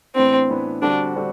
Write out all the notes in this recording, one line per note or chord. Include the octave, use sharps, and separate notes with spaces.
A2 E3 B3 C4 D4
A2 E3 B3 D4
D3 G3 C4 D4 F#4
D3 G3 C4 F#4